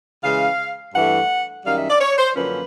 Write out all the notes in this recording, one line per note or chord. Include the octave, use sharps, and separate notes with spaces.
C#3 E3 G#3 F5
G2 E3 A3 F#5
F#2 D#3 G3 F5
E5
D5
C#5
C5
F#2 D3 F3 A#3 C#4 B4